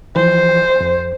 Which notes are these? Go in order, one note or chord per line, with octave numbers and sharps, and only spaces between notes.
E3 F3 C5
F2